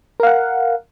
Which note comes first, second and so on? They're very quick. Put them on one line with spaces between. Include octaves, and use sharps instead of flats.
A#4 F5 F#5